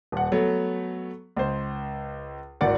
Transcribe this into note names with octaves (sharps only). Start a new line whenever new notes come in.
D#1 F#5
F#3 A3 B3
C#2 C5
D1 G#1 D#3 D5 F#5